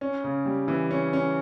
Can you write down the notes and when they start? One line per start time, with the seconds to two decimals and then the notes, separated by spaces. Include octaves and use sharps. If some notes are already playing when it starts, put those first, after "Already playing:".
0.01 C#4
0.24 C#3
0.46 G3
0.68 E3
0.91 C#4
1.13 C#4